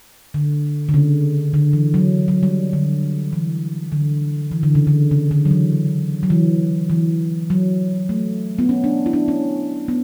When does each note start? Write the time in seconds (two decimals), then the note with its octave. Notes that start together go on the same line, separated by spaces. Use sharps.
0.34 D3
0.89 D3
0.94 C#3
1.54 D3
1.73 E3
1.94 F#3
2.28 F#3
2.43 G3
2.73 D3
3.33 E3
3.92 D3
4.51 E3
4.63 D3
4.75 C#3
4.87 D3
5.11 C#3
5.31 D3
5.45 F#3
5.51 E3
6.23 F#3
6.30 E3
6.90 E3
7.50 F#3
8.09 A3
8.59 B3
8.69 C#4
8.84 D4
9.06 E4
9.13 D4
9.28 C#4
9.88 B3